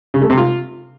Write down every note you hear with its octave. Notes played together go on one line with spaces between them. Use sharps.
C#3
A3
C3
F4